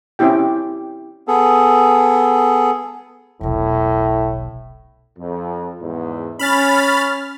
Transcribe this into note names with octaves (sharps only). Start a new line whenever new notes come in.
C4 C#4 E4 G4 G5
B3 G#4 A4
E1 B1 A2
F2
E2 G#2
C#4 B5 F6 A6